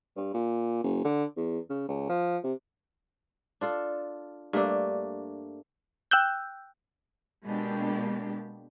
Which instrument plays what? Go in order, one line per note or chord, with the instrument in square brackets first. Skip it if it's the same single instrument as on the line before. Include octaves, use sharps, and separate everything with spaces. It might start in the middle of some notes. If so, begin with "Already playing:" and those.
[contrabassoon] G2
A#2
F#1
D3
E2
C#3
C#2
F3
C3
[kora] D4 F4 A4
G2 A3 A#3 D4
[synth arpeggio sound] G5 E6 F#6 G6
[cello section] B2 G#3 A#3 D4 G4